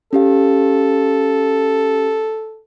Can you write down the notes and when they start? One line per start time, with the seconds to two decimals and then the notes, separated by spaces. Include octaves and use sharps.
0.13 C#4 G4 A4 F5